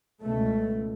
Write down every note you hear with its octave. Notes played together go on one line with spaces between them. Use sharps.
C#2 B2 A3